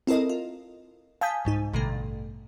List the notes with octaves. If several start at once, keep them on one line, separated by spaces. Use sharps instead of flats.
C4 E4 A4 A#4 D#5
F4
F5 G#5 A5 D#6 G6 B6
C2 G#2 D#4
A1 G2 B2 D3 A3